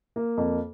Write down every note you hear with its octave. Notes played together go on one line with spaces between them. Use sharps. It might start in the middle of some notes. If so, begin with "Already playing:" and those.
A#3
F2